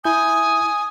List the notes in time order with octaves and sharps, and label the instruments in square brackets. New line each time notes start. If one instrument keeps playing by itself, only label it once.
[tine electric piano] E4 G6 [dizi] G#5 [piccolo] D#6